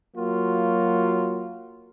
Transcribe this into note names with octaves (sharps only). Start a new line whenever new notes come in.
F#3 A#3 F4 F#4